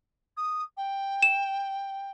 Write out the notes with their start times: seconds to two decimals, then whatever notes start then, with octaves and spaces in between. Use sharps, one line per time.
0.37 D#6
0.77 G5
1.22 E7